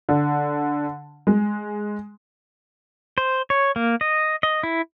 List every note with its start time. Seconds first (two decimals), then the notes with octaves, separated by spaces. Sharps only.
0.09 D3
1.27 G#3
3.18 C5
3.50 C#5
3.76 A#3
4.01 D#5
4.43 D#5
4.63 E4